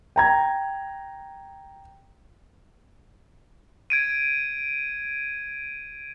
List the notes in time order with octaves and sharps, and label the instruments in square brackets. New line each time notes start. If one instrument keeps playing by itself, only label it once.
[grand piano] G5 A#5 G#6
[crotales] G#6 D7 D#7